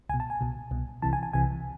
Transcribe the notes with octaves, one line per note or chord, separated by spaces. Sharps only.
C2 B2 G#5
A5
G#5
C2 B2
C2 B2
C2 C3 E3 A5
G#5
G#5
C2 C3 E3 G#5